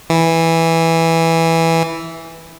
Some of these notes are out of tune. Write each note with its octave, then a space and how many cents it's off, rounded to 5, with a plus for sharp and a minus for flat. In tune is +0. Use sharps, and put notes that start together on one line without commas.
E3 -5